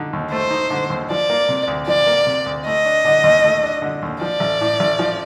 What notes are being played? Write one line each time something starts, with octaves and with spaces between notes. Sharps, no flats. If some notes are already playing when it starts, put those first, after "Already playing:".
Already playing: D3 D#4
D#2
A3 C5
D#4
D3
D#2
F3 D5
A#3
C3
D2
F3 D5
A#3
C3
D2
A3 D#5
D4
D3
D#2
A3
D4
D3
D#2
F3 D5
A1
A2
A1
F3